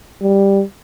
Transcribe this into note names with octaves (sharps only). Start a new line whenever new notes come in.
G3